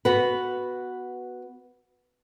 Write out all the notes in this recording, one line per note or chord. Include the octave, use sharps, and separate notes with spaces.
B3 F#4 B4